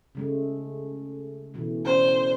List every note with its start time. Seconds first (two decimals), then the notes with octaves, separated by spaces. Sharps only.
0.15 C#3 G#3 A3
1.54 B2 E3 A3
1.86 C#4 D4 C5